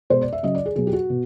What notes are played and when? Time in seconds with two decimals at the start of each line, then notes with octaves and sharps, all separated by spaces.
0.10 B2 G#3 C5
0.21 D5
0.32 E5
0.43 C#3 F#3 D#5
0.55 D5
0.66 G#4
0.76 B2 F#3 G#4
0.87 G4
0.93 F#4
1.10 B2